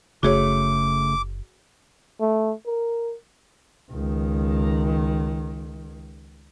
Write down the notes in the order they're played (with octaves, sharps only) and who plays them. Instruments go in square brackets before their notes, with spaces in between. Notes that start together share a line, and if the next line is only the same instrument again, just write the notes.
[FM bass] F#1 [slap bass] C#3 A3 [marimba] F#4 G#4 C#5 [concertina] D6
[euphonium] A3
A#4
[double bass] C#2 D#3